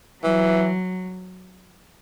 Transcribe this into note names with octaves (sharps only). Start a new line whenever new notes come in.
E3 F#3